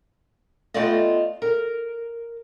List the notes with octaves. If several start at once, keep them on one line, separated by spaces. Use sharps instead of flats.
A3 B3 C4 F4 D5 D#5
A#4